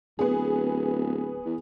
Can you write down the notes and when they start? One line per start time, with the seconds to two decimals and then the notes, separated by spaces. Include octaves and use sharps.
0.19 D1 B3 G#4
1.45 E2